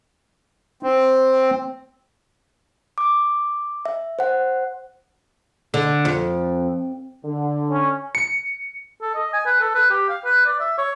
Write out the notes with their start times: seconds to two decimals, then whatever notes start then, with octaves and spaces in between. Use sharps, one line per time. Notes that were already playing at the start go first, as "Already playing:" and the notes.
0.83 C4
2.98 D6
3.85 E5
4.19 C5 F#5
5.74 D3
6.05 F2
7.25 D3
7.70 C#4
8.15 C#7
9.02 A4
9.15 D#5
9.33 G#5
9.46 B4
9.60 A4
9.75 B4
9.90 G4
10.09 F5
10.25 B4
10.46 D5
10.60 E5
10.78 C#5